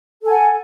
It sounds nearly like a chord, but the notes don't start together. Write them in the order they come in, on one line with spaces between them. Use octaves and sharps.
A4 G#5 F#5